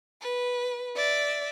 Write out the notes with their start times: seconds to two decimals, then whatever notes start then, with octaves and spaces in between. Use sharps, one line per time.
0.21 B4
0.96 D5 E5